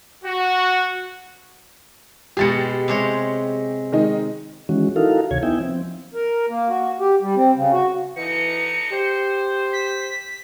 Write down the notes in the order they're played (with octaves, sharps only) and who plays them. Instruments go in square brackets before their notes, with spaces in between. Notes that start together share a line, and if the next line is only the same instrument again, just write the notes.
[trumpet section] F#4
[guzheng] B2 G#3 G#4 [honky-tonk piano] G4 A6 C#7
[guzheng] C3 G#3 C#5
[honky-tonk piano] D#3 G#3 D#4
[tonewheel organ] D#3 E3 G#3 C#4 F#4
D#4 E4 F#4 A4 A#4 F5
D2 C3 D#3 C#5 G#6
B3 D#4 E4 E5 G5 G#5
F3 C4
[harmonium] A#4
A#3
F#4
G4
G3
C4
C#3
F#4
[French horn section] B2 D3 D#4 [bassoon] E3 [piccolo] C#7
[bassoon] G4 [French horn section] C5
[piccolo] B6